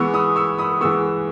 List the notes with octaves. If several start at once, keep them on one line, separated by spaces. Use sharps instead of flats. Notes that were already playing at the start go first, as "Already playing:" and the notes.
Already playing: E3 G#3 B3 C#6 E6
B5 D#6
C#6 E6
B5 D#6
E3 G#3 B3 C#6 E6